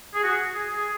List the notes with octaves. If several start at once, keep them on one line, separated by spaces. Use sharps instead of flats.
G#4
F#4
G#4
G#4